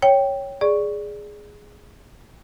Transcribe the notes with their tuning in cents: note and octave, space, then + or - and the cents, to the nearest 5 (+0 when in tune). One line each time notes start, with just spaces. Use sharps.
C#5 +0 G5 +0
G#4 +0 D5 +0 C#6 +0